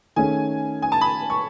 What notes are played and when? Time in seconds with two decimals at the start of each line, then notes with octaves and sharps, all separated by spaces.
0.16 D#3 A3 C#4 G#4 G#5
0.82 G#5
0.92 A5
1.01 B5
1.30 C#6